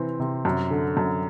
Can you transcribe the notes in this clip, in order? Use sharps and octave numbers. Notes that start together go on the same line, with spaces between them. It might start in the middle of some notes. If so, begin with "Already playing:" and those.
Already playing: C3 E3 C4
C3
F#2
D3
F#2